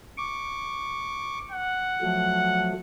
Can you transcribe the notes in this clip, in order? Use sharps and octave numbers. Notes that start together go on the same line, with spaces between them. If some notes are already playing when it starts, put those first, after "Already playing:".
C#6 D6
F#5
F3 F#3 A3